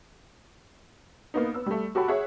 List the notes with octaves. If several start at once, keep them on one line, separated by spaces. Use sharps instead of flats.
A#3 B3 D#4
B3 E6
G3 A3
F#4 G4 A4 B5
G#4 C#5 E5 F#5